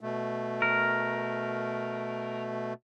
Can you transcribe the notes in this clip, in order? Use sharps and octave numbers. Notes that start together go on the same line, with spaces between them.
B2 A3
A#4